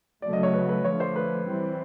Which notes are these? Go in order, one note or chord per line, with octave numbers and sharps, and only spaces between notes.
C#3 F#3 A3 D5
D#5
C#5
B4
B4
D3 F3 A3 C#5
C5
B4
E3 G3 C4